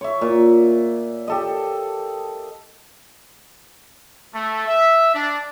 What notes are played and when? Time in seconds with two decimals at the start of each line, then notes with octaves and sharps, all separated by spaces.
0.01 C#5 E5
0.21 A#2
1.28 G4 A4 D#5
4.34 A3
4.68 E5
5.14 D4